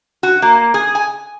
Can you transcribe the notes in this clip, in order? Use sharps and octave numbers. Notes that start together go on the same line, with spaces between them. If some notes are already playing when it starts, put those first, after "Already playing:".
F#4
A#3
G#4
G#5